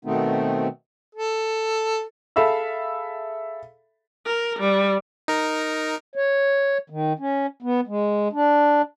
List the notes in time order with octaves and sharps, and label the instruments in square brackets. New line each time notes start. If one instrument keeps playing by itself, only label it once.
[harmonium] B2 D#3 A3 B3 C4 D#4
[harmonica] A4
[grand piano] G#4 A4 E5 F5 B5 E6
[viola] A#4
G3
[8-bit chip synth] D#4 A#4
[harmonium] C#5
D#3
C#4
B3
G#3
D4